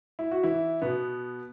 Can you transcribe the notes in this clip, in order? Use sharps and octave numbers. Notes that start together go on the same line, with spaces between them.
E4
F#4
E3 E4
B2 B3